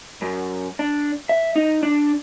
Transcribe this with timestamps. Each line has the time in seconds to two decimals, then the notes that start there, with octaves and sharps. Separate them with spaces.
0.22 F#2
0.79 D4
1.29 E5
1.56 D#4
1.83 D4